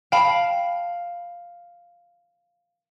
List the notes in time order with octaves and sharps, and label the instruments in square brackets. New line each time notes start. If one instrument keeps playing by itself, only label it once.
[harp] F5 [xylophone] G5 A5 B5